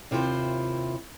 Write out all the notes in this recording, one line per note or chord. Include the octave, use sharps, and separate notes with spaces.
D#2 C3 E4 F4 A4 C5